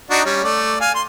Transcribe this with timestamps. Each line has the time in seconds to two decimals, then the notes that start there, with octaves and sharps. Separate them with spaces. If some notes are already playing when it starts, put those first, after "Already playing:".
0.10 D4 D#4 F#4
0.25 G3 C#4
0.44 A3 D5
0.81 F5 G#5
0.95 C6